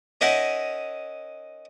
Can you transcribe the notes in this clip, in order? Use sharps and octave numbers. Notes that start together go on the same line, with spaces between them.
C#4 D#4 A#4 E5 F#5